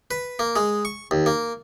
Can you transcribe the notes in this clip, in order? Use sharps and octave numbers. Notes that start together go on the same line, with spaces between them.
B4
A#3
G#3
C#6
D#2
A#3